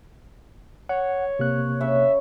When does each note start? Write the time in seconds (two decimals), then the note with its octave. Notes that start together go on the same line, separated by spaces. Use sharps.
0.89 C#5 F#5
1.39 C3 A#3 F#6
1.81 C#3 C#5 E5